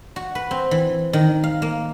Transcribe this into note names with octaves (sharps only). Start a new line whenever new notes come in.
F#4
B4
C4
E3
D#3
F5
A#3